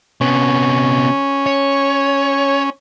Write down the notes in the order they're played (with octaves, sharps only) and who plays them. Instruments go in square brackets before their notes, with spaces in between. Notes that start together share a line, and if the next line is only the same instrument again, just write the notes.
[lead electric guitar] C3 B3 [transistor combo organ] C#4
[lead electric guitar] C#5